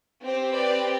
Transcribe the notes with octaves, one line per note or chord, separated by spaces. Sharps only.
C4 G4 C5
B4 D5